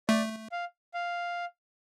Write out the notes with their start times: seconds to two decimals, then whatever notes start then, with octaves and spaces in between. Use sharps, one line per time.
0.09 A3 D5
0.52 F5
0.94 F5